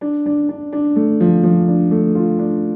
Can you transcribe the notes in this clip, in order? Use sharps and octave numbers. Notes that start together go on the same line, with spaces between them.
D4
D4
D4
D4
A3
F3
F3
D4
A3
F4
D4